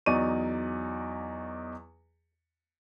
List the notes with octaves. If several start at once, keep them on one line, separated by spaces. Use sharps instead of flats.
E2 F#3 D#4 D5 C#6 D#7